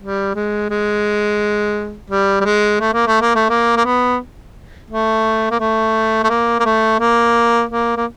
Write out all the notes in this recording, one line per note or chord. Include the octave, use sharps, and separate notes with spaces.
G3
G#3
G#3
G3
G3
G#3
A3
A#3
A3
A#3
A3
A#3
A#3
B3
A3
A#3
A3
A3
A#3
A#3
A3
A#3
A#3
A#3